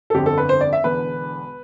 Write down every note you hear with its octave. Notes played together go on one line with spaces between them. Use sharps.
A4
G1 F2 D3 G4
A4
B4
C5
D5
E5
E1 E2 D3 B4